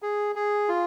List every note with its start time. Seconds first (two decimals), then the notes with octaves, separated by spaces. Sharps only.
0.02 G#4
0.36 G#4
0.69 F4